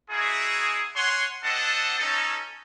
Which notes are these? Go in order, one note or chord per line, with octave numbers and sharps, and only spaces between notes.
D#4 E4 F#4 G#4
C#5 F#5 G#5 C6
C4 D4 A4 D#5 F#5 A5
C#4 D#4 A4